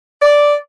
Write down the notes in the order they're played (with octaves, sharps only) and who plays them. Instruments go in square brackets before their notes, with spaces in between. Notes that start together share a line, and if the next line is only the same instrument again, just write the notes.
[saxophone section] D5